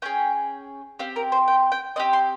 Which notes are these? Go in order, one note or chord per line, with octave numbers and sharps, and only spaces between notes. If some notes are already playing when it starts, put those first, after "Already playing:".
C#4 G#4 G5
C4 G4 F5
A#4
C5
G5
G5
C4 G4 D#5
C6